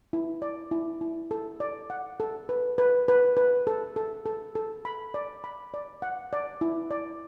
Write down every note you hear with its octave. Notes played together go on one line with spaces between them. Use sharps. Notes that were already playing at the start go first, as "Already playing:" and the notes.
E4
D5
E4
E4
A4
D5
F#5
A4
B4
B4
B4
B4
A4
A4
A4
A4
B5
D5
B5
D5
F#5
D5
E4
D5